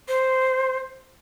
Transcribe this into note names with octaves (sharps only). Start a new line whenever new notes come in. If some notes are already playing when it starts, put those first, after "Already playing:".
C5